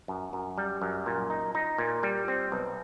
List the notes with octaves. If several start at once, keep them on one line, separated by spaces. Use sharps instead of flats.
F#2
F#2
G3
F#2
A#2
D#4
D#4
A#2
G3
C4
B1